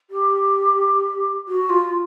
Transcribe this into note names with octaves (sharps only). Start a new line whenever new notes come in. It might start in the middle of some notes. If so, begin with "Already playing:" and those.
G4
F#4
F4